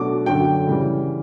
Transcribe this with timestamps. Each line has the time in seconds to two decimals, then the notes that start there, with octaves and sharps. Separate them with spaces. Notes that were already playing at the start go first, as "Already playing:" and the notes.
Already playing: B2 F#3 A3 D4 D6
0.26 F#2 D3 F#3 G5
0.67 C#3 E3 G3